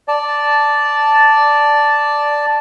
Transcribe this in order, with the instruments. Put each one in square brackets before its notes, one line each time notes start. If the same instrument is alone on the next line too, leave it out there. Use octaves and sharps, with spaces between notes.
[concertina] D5 A5